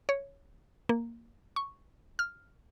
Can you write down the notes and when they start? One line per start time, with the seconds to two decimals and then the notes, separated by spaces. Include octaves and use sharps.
0.09 C#5
0.89 A#3
1.56 C#6
2.19 F6